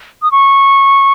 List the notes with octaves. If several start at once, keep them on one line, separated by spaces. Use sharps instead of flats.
D#6
C#6